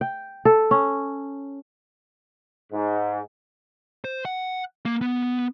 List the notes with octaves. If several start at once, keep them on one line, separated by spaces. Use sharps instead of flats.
G5
A4
C#4
G#2
C5
F#5
A#3
B3